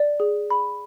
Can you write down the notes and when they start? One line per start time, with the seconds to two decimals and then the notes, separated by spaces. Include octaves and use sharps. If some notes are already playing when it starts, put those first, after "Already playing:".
Already playing: D5
0.20 G#4
0.50 B5